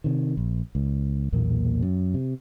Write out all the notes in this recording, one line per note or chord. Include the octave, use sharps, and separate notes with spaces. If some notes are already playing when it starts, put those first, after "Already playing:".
C3 D#3
A#1
C#2
B1 E2 A#2 A#3
F#2
C3